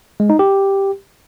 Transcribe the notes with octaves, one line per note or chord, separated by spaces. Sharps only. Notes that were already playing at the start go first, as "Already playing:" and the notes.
G#3
D#4
G4